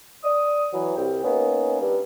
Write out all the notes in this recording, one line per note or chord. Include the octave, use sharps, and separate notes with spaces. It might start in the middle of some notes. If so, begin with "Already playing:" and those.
D5 D#6
E3 F#3
C2 G5
A#3 B3 C#4 D#4
G2